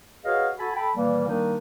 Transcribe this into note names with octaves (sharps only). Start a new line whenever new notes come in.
F#4 G#4 B4 C#5 D#5 F5
F#4 A4 G#5 A5 B5
A4 G5 A5 B5
A#2 D#3 E3 G3 A#3
D#3 G3 A#3 D4 D#4